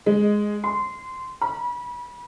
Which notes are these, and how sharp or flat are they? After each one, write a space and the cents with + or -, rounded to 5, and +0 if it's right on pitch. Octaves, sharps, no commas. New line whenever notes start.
G#3 +0
C6 -20
B5 -30